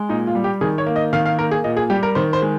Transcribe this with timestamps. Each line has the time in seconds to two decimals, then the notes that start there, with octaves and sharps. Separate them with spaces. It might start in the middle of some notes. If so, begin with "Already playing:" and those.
Already playing: G#3
0.09 A#2 D#4
0.27 F4
0.35 G3
0.44 G4
0.61 D#3 G#4
0.78 C#5
0.87 A#3
0.96 D#5
1.13 D#3 F5
1.26 F5
1.39 A#3 A#4
1.51 G#4
1.64 A#2 D#5
1.77 G#4
1.90 G3 G4
2.03 A#4
2.15 D#3 C5
2.33 C5
2.42 G#3